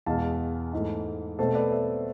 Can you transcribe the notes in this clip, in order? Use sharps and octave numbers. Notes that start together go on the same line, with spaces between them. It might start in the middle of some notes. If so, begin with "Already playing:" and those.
E2 B2 G#3 F5 A5
G#2 E3 A3
B2 A3 C4 A4 C5
B4 D5
C5 E5